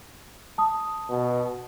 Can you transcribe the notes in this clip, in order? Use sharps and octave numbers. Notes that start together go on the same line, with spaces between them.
A5 D#6
B2